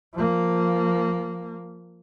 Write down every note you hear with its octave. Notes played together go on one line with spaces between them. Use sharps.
F3 A#3